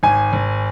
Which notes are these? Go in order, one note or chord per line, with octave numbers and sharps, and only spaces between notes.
G#1 G#5
G#1